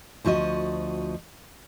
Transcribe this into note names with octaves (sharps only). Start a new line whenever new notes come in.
D2 F3 F#4 D#5